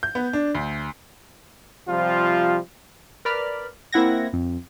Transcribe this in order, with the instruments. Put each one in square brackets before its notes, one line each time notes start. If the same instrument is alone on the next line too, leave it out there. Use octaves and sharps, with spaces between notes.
[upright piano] G6
B3
D4
D2
[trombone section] C3 F3 G3 F4
[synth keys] A#4 B4 D5 B5 F6
A#3 C4 E4 F#5 G#6 A#6
F2